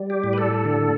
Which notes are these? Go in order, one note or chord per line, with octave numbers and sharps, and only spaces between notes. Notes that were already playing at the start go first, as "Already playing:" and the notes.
Already playing: G3
G4
A2
B4
A4
D3